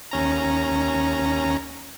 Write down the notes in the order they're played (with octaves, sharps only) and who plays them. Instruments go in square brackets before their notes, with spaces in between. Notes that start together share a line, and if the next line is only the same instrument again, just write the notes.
[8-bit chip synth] D#2 C#4 A#5